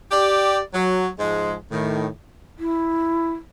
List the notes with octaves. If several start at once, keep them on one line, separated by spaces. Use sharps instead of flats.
G4 D5
F#3
G#2 F3 G#3
A2 D#3
E4